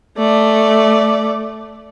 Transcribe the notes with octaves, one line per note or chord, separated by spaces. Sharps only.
A3 D5